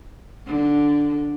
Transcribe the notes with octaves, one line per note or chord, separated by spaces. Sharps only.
D3